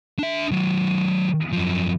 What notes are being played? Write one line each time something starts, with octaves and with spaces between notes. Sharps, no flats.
D4 E5
D#3 F#3
F#2 F3